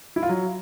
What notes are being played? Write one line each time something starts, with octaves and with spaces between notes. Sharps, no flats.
E4
F4
F#3